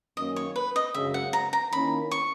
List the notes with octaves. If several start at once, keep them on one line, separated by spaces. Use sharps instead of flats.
F#2 D#3 A#3 C#4 D#5
C#5
B4
D#5
F#2 C#3 G#3 E5
F#5
A#5
A#5
D#3 A#3 C#4 E4 B5
C#6